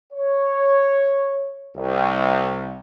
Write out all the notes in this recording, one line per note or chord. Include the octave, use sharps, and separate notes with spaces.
C#5
C2